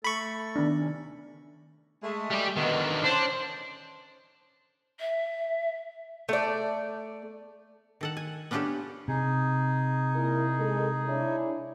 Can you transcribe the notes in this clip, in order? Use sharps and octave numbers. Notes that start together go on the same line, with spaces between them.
A3 A4 B5 C#6
D#3 B3 D4
C3 C#4
G#3 A3
G3 G4
B2 D3 D#3
C#4 D4 C5
E5
A3 D5
D#3 A4 F#5
G#5
B3 C#4 D4 F4 G4 A4
C3 D#4 G#4
A#2 E4 A#4
G#3 A4 A#4
D4 E4 C#5